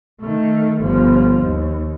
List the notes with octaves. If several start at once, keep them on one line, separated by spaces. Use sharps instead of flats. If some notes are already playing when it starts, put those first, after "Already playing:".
D#3 A3
G1 F3
D#2